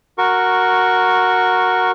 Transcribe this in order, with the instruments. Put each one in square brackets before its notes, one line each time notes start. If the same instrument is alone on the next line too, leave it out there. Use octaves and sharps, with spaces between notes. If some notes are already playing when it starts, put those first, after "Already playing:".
[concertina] F#4 A#4 C#6